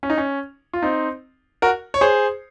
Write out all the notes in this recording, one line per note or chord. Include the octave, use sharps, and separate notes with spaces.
C#4
D#4
C#4
F4
C4 D#4
F#4 A#4
C#5
G#4 C5